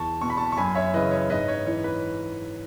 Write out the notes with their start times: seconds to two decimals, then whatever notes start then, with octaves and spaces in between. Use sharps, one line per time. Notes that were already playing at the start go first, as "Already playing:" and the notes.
Already playing: E2 A5 C#6
0.21 B2 C#6
0.30 B5
0.37 A5 C#6
0.52 C#6
0.57 F#2 G#5 B5
0.75 C#5 E5
0.93 C#3 E3 B4 D#5
1.11 C#5
1.30 G#2 B4 D#5
1.48 C#5
1.66 E3 C#5
1.84 B4